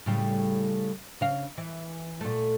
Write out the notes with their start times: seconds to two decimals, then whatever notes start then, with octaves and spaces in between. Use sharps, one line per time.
0.06 A2 C#3 G3
1.21 C#3 F5
1.58 E3
2.21 A#2 A3